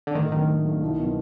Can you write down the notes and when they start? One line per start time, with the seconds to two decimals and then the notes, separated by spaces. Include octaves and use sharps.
0.07 D3
0.15 A2 D#3
0.31 D#3 F#3 A3 D4
0.48 A2
0.65 F#3 A3 D4
0.81 C2
0.99 B2 F#3